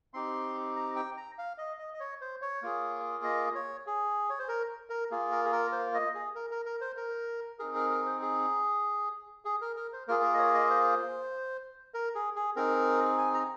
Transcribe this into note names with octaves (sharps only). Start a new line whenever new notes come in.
C4 D#4 G4 C6
A#5
G5
A#5
F5
D#5
D#5
D#5
C#5
C5
C#5
A#3 F4 G#4
D#5
C#5
G#4
C#5
C5
A#4
A#4
A#3 F4 G#4
A#4
G#4
A#4
C5
D#5
G#4
A#4
A#4
A#4
C5
A#4
C4 D#4 G#4 A#4
A#4
A#4
C5
G#4
G#4
A#4
A#4
C5
A#3 F4 G#4 A#4
A#4
D#5
C#5
D#5
C5
A#4
G#4
G#4
C4 D#4 G#4 A#4
G#5
A#5